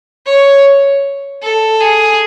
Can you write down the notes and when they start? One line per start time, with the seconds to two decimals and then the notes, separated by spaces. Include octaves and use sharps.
0.26 C#5
1.42 A4
1.80 G#4